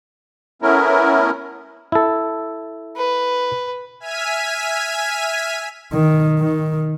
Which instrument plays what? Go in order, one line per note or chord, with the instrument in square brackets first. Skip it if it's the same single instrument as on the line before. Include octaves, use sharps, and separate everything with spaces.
[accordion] A3 B3 C#4 E4 A#4
[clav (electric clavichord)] E4 A4
[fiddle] B4
[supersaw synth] E5 G#5 F6 G#6 B6 D#7
[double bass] D#3
D#3